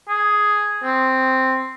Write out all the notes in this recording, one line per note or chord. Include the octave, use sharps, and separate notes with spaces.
G#4
C4